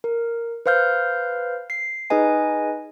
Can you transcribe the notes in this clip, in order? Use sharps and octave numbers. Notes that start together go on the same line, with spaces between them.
A#4
B4 C5 F5 F6 G6
C7
D#4 G#4 B4 D#5 G#5